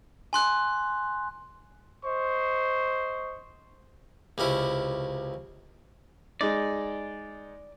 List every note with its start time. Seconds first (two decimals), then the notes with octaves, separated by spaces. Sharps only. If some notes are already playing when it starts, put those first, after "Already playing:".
0.33 G#5 C6 F#6
2.05 C5 D#5 C#6
4.38 C#2 C3 C#4 E4
6.41 G#3 D#4 D5